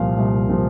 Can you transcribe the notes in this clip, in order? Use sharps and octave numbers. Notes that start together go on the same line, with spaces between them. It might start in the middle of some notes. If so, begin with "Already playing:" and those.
Already playing: C2 A#2 F3 F5
C2
A#2 F3